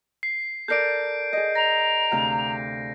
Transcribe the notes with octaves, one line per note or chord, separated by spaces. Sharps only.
C7
A4 A#4 D5 G6 C7 D7
G#4 D#5
A#5 A#6
D2 C3 F5